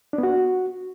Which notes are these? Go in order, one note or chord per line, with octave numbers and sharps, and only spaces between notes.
D4
B3
F#4